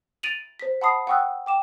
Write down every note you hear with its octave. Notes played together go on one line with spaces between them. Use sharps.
A6 D7 D#7 F7 F#7
C5 B6
F#5 A5 B5 C#6 D#6 C7
F#5 G5 C#6 D#6 E6 F#6
G5 D6 E7